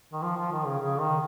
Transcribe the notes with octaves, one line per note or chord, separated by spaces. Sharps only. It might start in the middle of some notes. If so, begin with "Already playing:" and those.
D#3
F3
F3
D#3
C#3
C#3
D#3